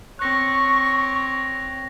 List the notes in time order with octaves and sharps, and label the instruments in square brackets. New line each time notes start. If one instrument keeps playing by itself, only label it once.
[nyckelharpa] C4 C#5 [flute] C#6 [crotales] F#6 A#6